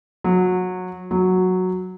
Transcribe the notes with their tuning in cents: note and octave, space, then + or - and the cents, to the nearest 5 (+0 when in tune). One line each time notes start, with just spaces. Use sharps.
F#3 -20
F#3 -5